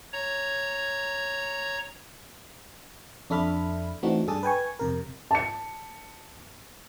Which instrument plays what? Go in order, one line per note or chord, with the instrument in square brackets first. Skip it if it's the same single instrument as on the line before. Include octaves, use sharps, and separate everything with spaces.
[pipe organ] C#5 A#5
[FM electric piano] F2 D4 A4 E5 B5 F6
E3 A3 C4 D4 D#4 F#4
G2 D4 G#4 A4 A5 D#6
B4 G5 G#5 C#6
F2 C3 A#4
[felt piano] A5 C#7